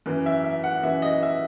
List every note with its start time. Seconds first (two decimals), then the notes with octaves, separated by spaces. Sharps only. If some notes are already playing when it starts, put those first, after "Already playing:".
0.06 F#2 E3
0.26 E5
0.44 E5
0.64 F#5
0.83 F#2 E3 E5
1.02 D#5
1.23 E5